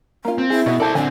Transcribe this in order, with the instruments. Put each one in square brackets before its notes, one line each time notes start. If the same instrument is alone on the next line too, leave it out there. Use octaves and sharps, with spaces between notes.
[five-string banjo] A#3 F4 [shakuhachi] C#4
[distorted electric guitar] C4
[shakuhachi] E4 [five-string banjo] G#4
[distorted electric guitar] B2 [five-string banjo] F#4 E5
[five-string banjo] A4 A5 [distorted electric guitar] C5 D5
[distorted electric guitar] D3 C4 [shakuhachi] D4 [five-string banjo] G#5